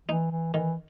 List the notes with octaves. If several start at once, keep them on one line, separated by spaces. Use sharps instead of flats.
E3 D#4
E3
D#3 E3